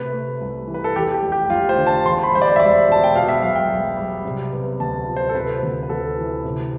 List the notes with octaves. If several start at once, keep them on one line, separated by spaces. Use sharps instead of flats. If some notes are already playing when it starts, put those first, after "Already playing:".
Already playing: C3 A3 B4
A3
C2
E3
B4
A4
E2 G4
G4
F1
G4
F1 F4
C5
D3
A5
E2 C6
B5
G3 C5
D5
E5
E1 D5
B2 A5
G5
B2 F5
E5
B1 F5
G5
B1
G3
C3
B3
D2 A5
F3
C5
A4
C3 B4
D2
B4
D2 A4
E3
C3